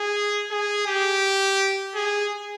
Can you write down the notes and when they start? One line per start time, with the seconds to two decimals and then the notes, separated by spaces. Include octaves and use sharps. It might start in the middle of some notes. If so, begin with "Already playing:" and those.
Already playing: G#4
0.51 G#4
0.87 G4
1.95 G#4